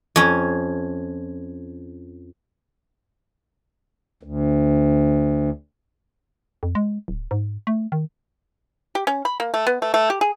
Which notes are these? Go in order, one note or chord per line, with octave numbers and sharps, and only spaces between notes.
F2 C#4
D2
F2
G#3
D1
G#2
A3
D#3
G4
C#4
B5
A#3
A3
B3
A3
A3
G4
G#4